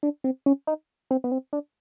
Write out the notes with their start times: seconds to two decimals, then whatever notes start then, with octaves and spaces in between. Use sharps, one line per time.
0.03 D4
0.24 C4
0.46 C#4
0.67 D#4
1.11 C4
1.24 B3
1.32 C4
1.53 D4